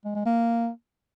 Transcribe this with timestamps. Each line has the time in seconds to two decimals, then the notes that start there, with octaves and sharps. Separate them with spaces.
0.05 G#3
0.15 G#3
0.26 A#3